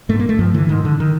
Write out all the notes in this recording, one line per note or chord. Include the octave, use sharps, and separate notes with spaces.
G#2 A3
A#3
A3
G2 F3
D3 E3
G#2 D#3
D3
D#3